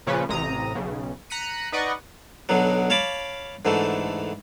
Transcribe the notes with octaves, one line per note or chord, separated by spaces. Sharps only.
A#2 C#3 F3 C#4 B4
A1 C3 A#5 D#6
B1 C#3
A#5 F#6 B6 C#7 D#7
D#4 B4 D5 D#5 F#5 C#6
B1 B2 D3 F#3
C#5 F5 A5 B5 D6
G#2 D3 E3 A3